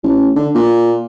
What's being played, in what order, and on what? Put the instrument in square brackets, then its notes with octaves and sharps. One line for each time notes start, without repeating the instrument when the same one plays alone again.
[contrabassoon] A1
D3
A#2